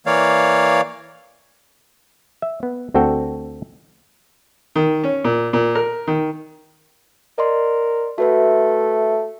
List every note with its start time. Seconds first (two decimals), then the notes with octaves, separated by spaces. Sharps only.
0.06 E3 A#3 C#5 D5 F5
2.42 E5
2.63 B3
2.94 D2 C4 F#4 A4 G5
4.76 D#3
5.04 C#4
5.24 A#2
5.53 A#2
5.75 A#4
6.07 D#3
7.38 A#4 D5 D#5 C6
8.18 A3 F#4 B4 E5